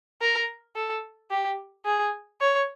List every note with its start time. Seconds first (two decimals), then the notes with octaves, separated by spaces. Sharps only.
0.21 A#4
0.76 A4
1.30 G4
1.86 G#4
2.41 C#5